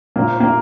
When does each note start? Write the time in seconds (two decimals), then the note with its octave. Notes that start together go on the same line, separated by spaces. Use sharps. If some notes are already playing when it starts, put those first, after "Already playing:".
0.16 A#2 A#3
0.40 A#3